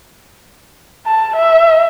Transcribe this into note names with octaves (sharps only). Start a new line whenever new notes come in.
A5
E5